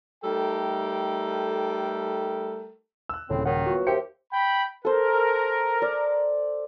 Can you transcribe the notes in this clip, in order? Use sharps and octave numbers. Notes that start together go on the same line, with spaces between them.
G3 A3 D#4 A4 A#4 G5
E6 F#6
D#1 A2 C#3 C4
D#3 F#3 F#5
B3 F4 F#4
D#2 G4 C5 E5 G5 C#7
G5 B5
A4 A#4 C5
D5